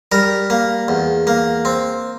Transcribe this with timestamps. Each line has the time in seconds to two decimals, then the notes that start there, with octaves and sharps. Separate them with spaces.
0.12 G3 A#4
0.50 A#3
0.88 E2
1.27 A#3
1.65 C4